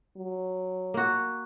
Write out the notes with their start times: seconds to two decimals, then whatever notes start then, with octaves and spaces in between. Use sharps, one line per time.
0.17 F#3
0.94 A#3 F#4